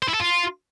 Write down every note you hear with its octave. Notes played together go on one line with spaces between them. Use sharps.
C5
E4
A4
F4